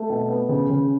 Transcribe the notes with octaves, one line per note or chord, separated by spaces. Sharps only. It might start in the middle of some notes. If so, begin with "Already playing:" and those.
Already playing: A3
B2
B3
C#3
C#3